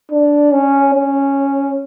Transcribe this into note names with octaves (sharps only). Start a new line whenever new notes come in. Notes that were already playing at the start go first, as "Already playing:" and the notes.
D4
C#4
C#4